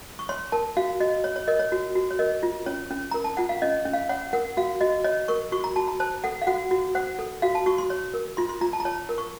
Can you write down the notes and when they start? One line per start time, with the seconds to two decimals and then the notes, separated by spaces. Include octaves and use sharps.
0.19 C#6
0.29 C#5 C6
0.52 A#4 A5
0.77 F#4 F5
1.00 F#4 D#5
1.24 C#5
1.36 C#5
1.47 A#4 D#5
1.59 C#5
1.72 F#4
1.95 F#4
2.11 C#5
2.19 A#4 D#5
2.43 F4
2.66 C#4 C#5
2.91 C#4
3.11 A#4 A#5
3.24 A5
3.37 F4 F#5
3.49 F5
3.62 C#4 D#5
3.85 C#4
3.93 F5
4.09 C#5 F#5
4.33 A#4 F#5
4.57 F#4 F5
4.81 F#4 D#5
5.04 C#5 D#5
5.28 A#4 C#6
5.52 F#4 C#6
5.64 A#5
5.76 F#4 A5
5.88 A#5
6.00 C5 A5
6.24 A4 F#5
6.42 F5
6.47 F#4 F#5
6.71 F#4
6.95 C5 F#5
7.19 A4
7.42 F#4 F5
7.55 A5
7.66 F#4 C#6
7.78 C6
7.90 C#5
8.14 A#4
8.37 F4 C6
8.49 C6
8.61 F4 A#5
8.73 A5
8.80 A#5
8.85 C#5 A5
9.09 A#4
9.18 C#6